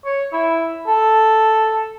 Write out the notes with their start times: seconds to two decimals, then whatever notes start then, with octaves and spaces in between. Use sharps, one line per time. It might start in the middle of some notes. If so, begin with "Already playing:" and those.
0.05 C#5
0.33 E4
0.87 A4